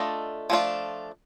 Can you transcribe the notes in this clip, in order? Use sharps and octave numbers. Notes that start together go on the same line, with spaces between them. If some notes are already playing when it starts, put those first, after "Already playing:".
Already playing: A3 D4 F4 A4 D#5
F3 A3 D4 F4